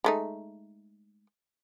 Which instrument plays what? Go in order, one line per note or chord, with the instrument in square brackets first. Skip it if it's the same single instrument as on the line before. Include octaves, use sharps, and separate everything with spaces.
[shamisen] G#3 A3 D#4